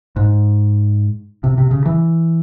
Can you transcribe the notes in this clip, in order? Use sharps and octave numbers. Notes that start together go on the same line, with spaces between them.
G#2
C3
C3
C#3
E3